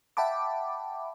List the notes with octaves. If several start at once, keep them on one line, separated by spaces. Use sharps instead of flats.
E5 F#5 G5 A5 B5 D6